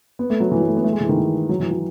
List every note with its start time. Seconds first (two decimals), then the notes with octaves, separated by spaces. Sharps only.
0.19 B3
0.30 A3
0.40 F#3
0.52 E3
0.60 F#3
0.68 A3
0.77 B3
0.84 A3
0.92 G#3
1.01 E3
1.09 D#3
1.17 E3
1.49 F#3
1.60 E3
1.71 F#3